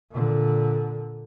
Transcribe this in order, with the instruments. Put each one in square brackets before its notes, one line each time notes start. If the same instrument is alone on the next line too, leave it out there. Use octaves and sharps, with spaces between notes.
[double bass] A#2 D3